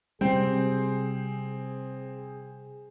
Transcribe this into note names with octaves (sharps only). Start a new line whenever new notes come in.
C3 G3 C4 G#4 C5